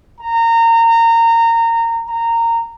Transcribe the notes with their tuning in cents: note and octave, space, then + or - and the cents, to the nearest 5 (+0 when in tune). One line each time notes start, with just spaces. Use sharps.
A#5 -25
A#5 -15